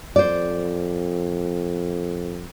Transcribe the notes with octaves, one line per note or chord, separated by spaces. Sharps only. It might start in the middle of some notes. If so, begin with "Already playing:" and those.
F2 C5 D5